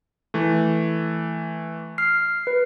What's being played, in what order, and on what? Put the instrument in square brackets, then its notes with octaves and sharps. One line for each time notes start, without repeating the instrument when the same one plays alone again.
[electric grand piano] E3 A3
[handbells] F6 C7
B4